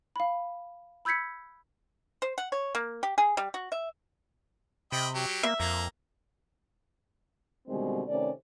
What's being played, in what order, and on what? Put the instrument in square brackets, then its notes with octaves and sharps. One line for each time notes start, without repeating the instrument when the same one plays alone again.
[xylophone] F5 B5
B5 E6 G6 G#6 B6 C#7
[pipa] C5
F#5
C#5
A#3
G4
G#4
G3
F#4
E5
[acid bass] C3 [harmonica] D#5 G5 B5
[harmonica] F#3 G4
[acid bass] A#3 [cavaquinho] E5
[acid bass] F2 [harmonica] A#3 A#5
[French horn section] B2 D3 D#3 G3 G#3 C4
C3 D#3 A3 C#4 C5 D5